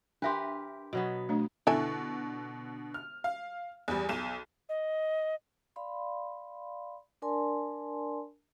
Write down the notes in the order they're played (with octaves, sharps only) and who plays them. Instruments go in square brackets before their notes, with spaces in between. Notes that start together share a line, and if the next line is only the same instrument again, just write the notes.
[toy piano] D4 E5 C6 [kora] G4 A#4 B4
[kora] B2 F#3 B3
[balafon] A3 D4
[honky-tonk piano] B2 D3 [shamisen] E4 A4 G#5
[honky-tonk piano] F6
F5
E2 G3
B1 E7
[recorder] D#5
[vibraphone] D5 F5 B5 C6
D4 A#4 D5 G#5 A5 C6